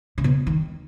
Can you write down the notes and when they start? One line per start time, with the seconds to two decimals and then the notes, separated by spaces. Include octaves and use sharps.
0.18 C#3
0.24 B2
0.47 D#3